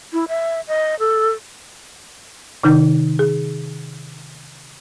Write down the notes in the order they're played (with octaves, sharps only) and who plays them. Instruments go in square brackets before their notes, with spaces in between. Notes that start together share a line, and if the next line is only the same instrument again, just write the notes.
[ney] E4
E5
D#5
A4
[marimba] C3 D#3 D#4 G6
G#4